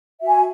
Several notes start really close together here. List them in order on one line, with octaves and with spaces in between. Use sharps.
E5 F#4 G#5